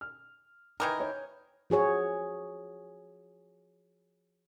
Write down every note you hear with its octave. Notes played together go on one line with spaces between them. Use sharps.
F6
D#3 E3 A#4 D#6 G6 G#6
C#5
F3 F#4 G#4 C#5